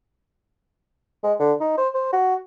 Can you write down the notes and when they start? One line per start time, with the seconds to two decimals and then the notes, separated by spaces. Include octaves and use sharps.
1.24 G#3
1.39 D3
1.61 D#4
1.78 C5
1.95 C5
2.13 F#4